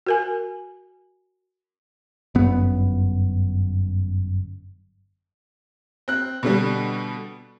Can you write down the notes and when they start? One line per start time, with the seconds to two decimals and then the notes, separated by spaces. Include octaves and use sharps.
0.07 F#4 A#4 G#5
2.35 G1 F#2 B3
6.08 C4 F#6
6.43 B2 D3 G3